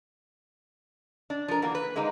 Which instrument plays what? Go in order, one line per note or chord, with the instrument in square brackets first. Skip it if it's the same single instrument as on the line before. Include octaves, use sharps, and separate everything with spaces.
[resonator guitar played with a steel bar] D4
F3 A#4
E3 F#3 A#3
B4
D3 G#3 A#3 D#4 B4